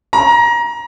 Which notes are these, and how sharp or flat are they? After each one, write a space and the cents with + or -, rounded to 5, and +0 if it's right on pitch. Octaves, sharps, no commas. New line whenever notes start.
A#5 +20